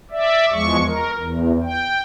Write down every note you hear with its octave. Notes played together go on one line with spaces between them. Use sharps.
D5 E5
E2 F3 G#3 C#6
A#4
E2
G5